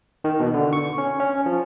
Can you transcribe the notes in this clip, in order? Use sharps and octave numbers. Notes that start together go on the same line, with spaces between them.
D#3
B2
D3
C#6
C#4
C#4
F3